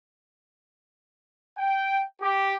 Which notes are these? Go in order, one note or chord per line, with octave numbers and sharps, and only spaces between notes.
G5
G4